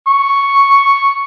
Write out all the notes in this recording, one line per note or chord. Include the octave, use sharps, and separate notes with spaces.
C#6